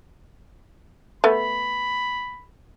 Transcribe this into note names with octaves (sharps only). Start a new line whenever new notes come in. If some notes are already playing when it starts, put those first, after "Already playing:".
A3 B3 B5